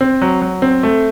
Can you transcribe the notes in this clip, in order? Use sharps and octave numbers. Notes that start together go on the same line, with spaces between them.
C4
F#3
F#3
C4
A3